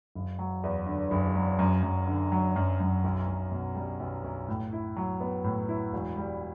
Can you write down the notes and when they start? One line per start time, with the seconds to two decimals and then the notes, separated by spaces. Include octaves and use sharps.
0.15 F#1
0.39 F#3
0.63 E2
0.86 D3
1.11 F#1
1.35 F#3
1.59 F#2
1.83 F#2
2.07 D3
2.32 F#3
2.56 F#2
2.80 F#2
3.04 B1
3.28 B1
3.51 B2
3.76 G3
4.00 B1
4.24 B1
4.48 A2
4.73 E4
4.96 F#3
5.20 B3
5.44 A2
5.69 E4
5.92 E1
6.17 G3